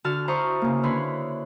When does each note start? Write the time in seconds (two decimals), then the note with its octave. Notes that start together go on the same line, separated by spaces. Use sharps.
0.04 D3 F#4 A5 F6
0.28 E4 C5 A5 A#5 C#6 D#6
0.61 C#3 A#3
0.83 D3 E4 B4 C#5 C6